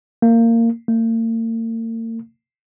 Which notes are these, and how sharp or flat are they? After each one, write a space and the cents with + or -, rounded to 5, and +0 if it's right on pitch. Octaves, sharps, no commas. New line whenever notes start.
A#3 -20
A#3 -45